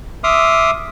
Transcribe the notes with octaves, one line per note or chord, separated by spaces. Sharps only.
E5 C6 D6 D#6 F6